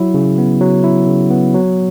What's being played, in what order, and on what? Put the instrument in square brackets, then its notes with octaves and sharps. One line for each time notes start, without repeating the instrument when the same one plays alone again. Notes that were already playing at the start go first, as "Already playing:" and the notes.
Already playing: [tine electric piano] F#3 E4
C#3
B3
F#3
E4
C#3
B3
F#3